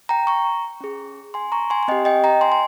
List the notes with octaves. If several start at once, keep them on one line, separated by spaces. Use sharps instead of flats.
G5 A#5
A#5 C#6
C#4 G#4
G#5 C6
A#5 C#6
G#5 C6
G#5
C4 G4 D#5 G5
D#5 G5
G5 A#5
G#5 C6
C6